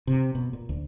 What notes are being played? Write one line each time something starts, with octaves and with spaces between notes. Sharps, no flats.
C3
B2
A#2
D2